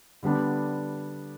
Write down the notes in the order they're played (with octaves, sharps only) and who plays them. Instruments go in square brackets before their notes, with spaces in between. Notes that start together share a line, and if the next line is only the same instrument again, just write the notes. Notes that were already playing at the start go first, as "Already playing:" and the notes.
[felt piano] D3 G3 B3 D4